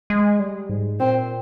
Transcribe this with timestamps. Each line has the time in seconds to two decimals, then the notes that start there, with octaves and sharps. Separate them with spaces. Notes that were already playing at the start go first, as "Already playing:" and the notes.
0.10 G#3
0.40 G3
0.69 G#2
0.99 A#2 C4